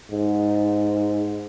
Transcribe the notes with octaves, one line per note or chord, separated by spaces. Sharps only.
G#2